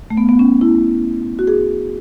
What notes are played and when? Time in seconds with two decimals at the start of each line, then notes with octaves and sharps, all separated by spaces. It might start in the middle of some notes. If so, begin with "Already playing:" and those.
0.10 A3
0.17 B3
0.29 B3
0.39 C#4
0.61 E4
1.39 F#4
1.47 G#4